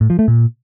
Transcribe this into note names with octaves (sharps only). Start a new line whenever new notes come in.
A2
F3
A3
A#2